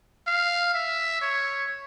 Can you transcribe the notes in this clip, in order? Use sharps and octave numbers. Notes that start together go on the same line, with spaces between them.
F5
E5
C#5